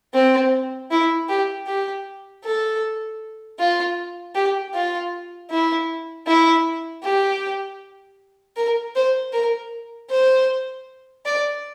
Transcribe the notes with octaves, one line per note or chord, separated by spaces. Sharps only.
C4
E4
G4
G4
A4
F4
G4
F4
E4
E4
G4
A#4
C5
A#4
C5
D5